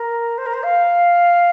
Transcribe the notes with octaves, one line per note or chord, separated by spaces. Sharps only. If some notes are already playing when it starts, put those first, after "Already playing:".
Already playing: A#4
C5
A#4
C5
F5